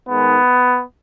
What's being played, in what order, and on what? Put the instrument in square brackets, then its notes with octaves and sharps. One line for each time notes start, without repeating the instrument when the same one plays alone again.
[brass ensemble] G#2 D#3 G#3 B3